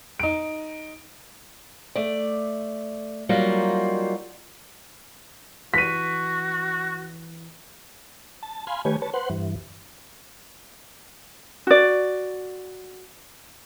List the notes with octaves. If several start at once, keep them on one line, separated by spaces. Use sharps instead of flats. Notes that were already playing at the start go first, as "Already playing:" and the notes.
D#4 D7
A3 D5
F#3 G3 A#3 D#4 F4 F#4
E3 F#4 B6 D#7
A5
F5 G#5 B5 C6
D#3 A3 G4 B4 C#5 G#5
B4 C#5 A5
B4 C5 F#5 C6
G2 E3
F#4 D5